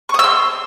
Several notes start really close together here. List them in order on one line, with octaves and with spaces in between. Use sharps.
C#6 D#6 E6 C6